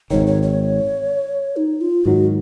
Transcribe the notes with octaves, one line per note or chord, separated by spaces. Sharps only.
G#1 G#2 D#3 C#5
C#5
C#5
D#4
F4
G#2 D#3 F#3 F#4